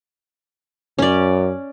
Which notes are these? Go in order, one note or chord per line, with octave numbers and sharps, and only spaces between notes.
F#2 C#4 D5